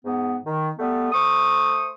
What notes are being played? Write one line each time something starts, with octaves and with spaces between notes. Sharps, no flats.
G#2 B3
D#3
G3 A3 B3
A3 C5 C#6 D#6